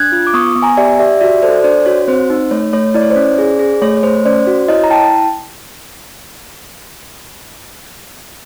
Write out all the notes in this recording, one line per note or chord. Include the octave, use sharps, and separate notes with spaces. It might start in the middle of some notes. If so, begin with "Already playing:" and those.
Already playing: D4 F#6 G#6
F4
D6
B3 C#6 D#6
B3
G#5 A#5
G4 D5 E5
G4 D5 E5
F#4 D5 E5
A4 C5 D5
D4 C5 D5
F#4 C#5
C4 C5
D#4
A3 C#5
A3 C#5
E4 D5
C#5
C5 D5
C#4
G#4
G#4
A3 C#5
C#5
A3 C5
C#4 C5 D5
F#4
E4 C#5 D#5
A#5
E4 G5 A5